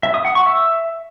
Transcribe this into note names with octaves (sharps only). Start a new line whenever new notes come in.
E5
D#6
F#5
C#6
E5